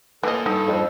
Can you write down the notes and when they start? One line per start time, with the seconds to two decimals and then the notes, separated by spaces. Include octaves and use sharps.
0.23 E3 A#3 F4 A4 D#5
0.46 G2 D#4 A4
0.68 F2